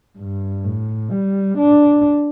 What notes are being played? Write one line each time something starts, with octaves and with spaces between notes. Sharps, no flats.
G2
A2
G3
D4